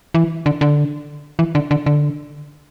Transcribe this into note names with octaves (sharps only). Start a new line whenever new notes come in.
E3
D3
D3
E3
D3
D3
D3